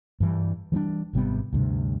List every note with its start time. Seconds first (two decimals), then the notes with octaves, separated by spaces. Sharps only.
0.20 G2 E3 G3
0.72 E3 G3 B3 D4
1.13 G#1 C3 G3 B3
1.53 D2 G2 C3